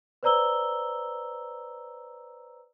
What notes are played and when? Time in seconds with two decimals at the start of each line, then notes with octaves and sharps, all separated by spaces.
0.23 B4 C5 D5 A#5 E6 G7